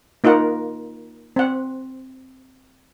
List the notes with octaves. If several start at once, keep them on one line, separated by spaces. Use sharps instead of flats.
A#3 D#4 F4 A#4 F#5
C4 F#5